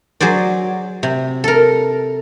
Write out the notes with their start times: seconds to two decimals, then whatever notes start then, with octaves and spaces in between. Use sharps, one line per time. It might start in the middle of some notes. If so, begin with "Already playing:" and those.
0.20 F#3 G#4 C5 D5
1.03 C3
1.44 A4 A#4